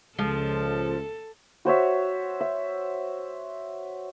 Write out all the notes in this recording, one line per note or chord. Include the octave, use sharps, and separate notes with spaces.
C#2 F3 G#3 A4
F#4 C5 C#5 E5
E5